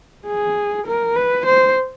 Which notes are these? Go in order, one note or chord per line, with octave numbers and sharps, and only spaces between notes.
G#4
A#4
B4
C5